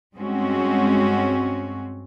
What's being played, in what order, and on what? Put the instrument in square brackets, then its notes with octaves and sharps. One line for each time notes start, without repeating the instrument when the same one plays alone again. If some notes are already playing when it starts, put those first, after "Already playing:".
[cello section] G2 G#3 C4 C#4 F#4